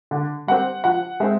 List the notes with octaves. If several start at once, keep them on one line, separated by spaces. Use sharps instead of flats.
D3
G3 C4 F#5
F3 F#5
G#3 C4 E5